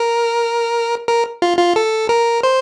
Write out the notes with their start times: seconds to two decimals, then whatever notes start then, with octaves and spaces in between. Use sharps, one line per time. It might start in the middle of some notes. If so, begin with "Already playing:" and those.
Already playing: A#4
1.08 A#4
1.42 F4
1.58 F4
1.76 A4
2.09 A#4
2.43 C5